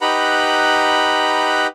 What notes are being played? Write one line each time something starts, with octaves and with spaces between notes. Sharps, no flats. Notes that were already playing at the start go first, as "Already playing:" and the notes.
D#4 G4 B4 F#5 A#5 B5